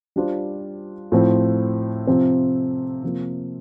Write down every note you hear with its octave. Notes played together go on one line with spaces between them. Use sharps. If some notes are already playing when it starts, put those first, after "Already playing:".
G3 D4 F4 C5
A2 F3 C4 E4
C3 F3 C4
C3 F3 A#3